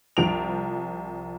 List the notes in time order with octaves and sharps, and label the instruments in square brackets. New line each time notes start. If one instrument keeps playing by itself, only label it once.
[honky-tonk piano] C2 F3 D7 F7